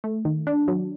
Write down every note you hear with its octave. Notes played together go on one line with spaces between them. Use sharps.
A3
D#3
D4
F#3